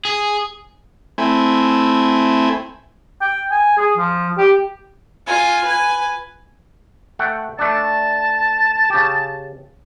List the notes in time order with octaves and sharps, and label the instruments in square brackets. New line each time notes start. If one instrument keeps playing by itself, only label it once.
[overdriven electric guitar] G#4
[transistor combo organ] A3 C4 E4 G#5
[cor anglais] G5
G#5
G#4
F3
G4
[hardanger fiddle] F4 G#5
B4 G#5
[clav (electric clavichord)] A3 F#5 G5
[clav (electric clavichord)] A3 D4 [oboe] A5
[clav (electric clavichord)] C#3 G4